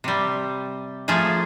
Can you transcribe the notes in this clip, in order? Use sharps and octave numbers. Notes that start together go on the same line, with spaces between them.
C3 G3
F3 A3 A#3 G#4